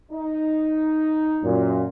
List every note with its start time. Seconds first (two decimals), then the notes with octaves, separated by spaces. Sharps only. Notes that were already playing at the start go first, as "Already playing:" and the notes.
0.12 D#4
1.43 F#2 A#2